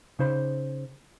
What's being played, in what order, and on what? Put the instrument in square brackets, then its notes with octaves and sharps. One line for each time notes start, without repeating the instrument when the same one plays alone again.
[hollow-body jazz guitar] C#3 D#4 C5 B5